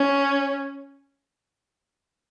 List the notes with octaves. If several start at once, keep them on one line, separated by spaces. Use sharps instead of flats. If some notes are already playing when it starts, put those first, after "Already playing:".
Already playing: C#4